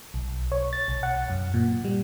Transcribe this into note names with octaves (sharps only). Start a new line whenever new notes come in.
B1
C#5
A6
B1
F#5
F#2
A#2
G3